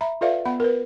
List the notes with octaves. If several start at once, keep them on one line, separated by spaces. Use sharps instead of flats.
E5 A#5 B5
F4 A4 B4 D5 E5 F5
B3 F#5 B5
A#4 B4